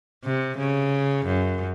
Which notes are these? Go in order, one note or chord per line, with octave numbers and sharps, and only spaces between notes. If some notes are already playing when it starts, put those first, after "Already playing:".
C3
C#3
F#2